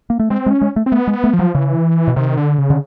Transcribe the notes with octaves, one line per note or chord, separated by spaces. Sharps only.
A#3
A3
G#3 C4
G#3
C#4
G#3
A3
C4
A3 B3
G#3
B3
A3
F3
F#3
C#3 E3
B2
C3 D#3
D3
C#3
D3